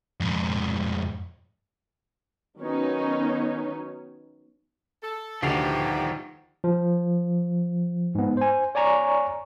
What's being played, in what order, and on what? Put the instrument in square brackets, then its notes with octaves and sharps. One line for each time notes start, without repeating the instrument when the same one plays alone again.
[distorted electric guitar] F2 G#2
[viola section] D#3 F#3 B3 C#4 D#4 C#5
[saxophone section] A4
[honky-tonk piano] D2 C7 F7 [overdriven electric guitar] D#3 F3 [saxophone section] B3 E4 G4
[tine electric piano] F3
G#2 B3
C5 G#5
C#5 D5 G#5 A#5 C#6